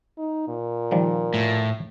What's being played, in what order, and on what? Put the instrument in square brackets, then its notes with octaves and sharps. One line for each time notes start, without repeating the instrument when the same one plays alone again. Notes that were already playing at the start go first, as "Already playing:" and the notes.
[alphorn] D#4
A#2
[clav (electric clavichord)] D#3 F3 G3
[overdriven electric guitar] A2